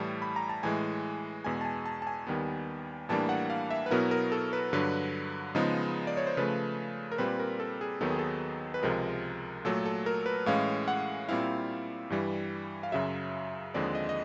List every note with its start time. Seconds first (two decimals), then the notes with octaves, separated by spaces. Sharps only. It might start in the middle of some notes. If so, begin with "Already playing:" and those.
Already playing: A2 E3 G3 A5
0.22 B5
0.36 A#5
0.49 A5
0.63 A2 E3 G#3 G#5
1.44 E2 B2 G#3 G#5
1.61 A5
1.65 G#5
1.86 A5
2.02 A5
2.07 G#5
2.27 D#2 D#3 G3 B3
3.09 A2 E3 G3 A#3 D4 A5
3.29 F#5
3.50 F5
3.71 E5
3.86 B4
3.90 B2 F#3 B3 E4 A#4
4.11 A#4
4.32 A4
4.53 B4
4.73 G2 D3 F#3 B4
5.55 C#3 F3 G#3 B3 D#4
6.07 D5
6.17 C#5
6.27 C5
6.37 C#3 F3 A3 B4
7.12 A#4
7.18 A#2 G3 C4 B4
7.40 A#4
7.60 A4
7.81 G#4
8.01 D#2 D#3 F#3 B3 D#4 A4
8.10 G#4
8.19 A4
8.74 B4
8.83 C#2 C3 F3 G#3 A#4
9.65 A#2 F#3 A3 A4
9.85 A4
10.06 A#4
10.26 B4
10.46 A2 E3 G#3 C#4 F5
10.88 F#5
11.28 A#2 G3 C4 E4 F5
12.10 G2 E3 G3
12.83 F5
12.92 F#2 C#3 F#3 E5
13.74 D#2 D3 F3 G#3 C4 D5
13.95 D#5
14.09 D#5